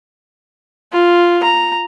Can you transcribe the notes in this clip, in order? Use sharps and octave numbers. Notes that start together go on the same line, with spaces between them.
F4
A#5